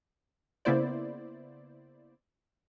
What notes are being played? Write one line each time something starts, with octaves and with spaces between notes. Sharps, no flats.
C#3 A#3 B3 E4 C5 D5